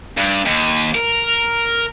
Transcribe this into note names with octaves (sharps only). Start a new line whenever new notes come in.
G2
D#2
A#4